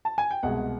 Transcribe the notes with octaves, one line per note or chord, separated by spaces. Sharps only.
A5
G#5
G5
C2 B2 G#3 F#5